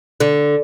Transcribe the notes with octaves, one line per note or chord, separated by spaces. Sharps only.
D3